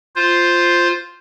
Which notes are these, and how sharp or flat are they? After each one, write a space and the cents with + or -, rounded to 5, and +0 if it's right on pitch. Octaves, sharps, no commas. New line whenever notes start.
F4 +0 C5 +0